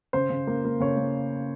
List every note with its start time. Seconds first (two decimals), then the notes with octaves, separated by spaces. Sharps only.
0.13 C#3 C5
0.30 C#3
0.47 A#3
0.64 A#3
0.80 C#3 C#5
0.97 A#3